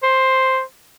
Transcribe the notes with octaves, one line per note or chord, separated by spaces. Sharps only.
C5